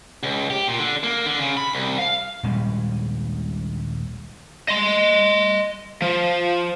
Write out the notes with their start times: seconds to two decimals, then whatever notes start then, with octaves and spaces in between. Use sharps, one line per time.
0.23 C#2
0.50 G4
0.67 A#2
0.79 D3
1.03 A#3
1.26 D3
1.39 C#3
1.57 B5
1.73 C2
1.98 F5
2.43 D#1 A#1 G3 G#3
4.68 D#5 C6
6.02 F3